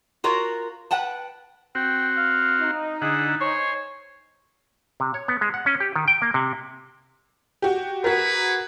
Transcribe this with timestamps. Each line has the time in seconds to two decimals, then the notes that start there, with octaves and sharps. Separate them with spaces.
0.24 F4 F#4 A#4 C#5
0.91 B4 F#5 G5 A5
1.75 C4 F#4 G5
2.17 F5
2.61 D#4
3.02 D3 E4 G#4 F#5
3.41 C5 C#5 G#5
5.00 C3
5.14 C#5
5.28 B3
5.41 G#3
5.54 F#5
5.66 C#4
5.80 G4
5.96 D#3
6.08 G5
6.22 A#3
6.34 C3
7.62 F#4 G4
8.04 F#4 G#4 A#4 B4